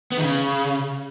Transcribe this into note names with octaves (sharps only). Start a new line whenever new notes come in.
B3
D#3
C#3